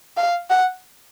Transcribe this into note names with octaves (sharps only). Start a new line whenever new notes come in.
F5
F#5